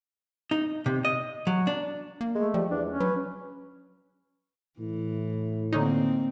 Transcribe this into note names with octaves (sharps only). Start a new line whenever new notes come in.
D#4
C3
D#5
F#3
D4
A#3
G#3 A3
F3 G3
E2 D4
C#4
F#3 B4
A2 E3
D3 A#3 C4 C#4 D#4